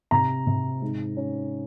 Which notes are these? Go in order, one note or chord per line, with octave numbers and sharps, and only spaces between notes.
C3 A#5
C3
G#2
C#4